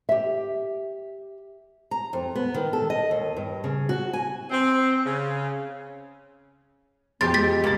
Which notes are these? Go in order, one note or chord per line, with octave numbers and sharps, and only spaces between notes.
G4 E5
A#5
F2
B3
D#3
A4
D#5
D#2
G2
C#3
F#4
G#5
C4
C#3
E1 F2 B3 G4 G#4 C6 A6
G#3 A6 B6
C#2 A#3 A6